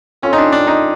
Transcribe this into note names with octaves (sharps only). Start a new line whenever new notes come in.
C4 C#4 F4 A4
D#4
D4
D4
D#4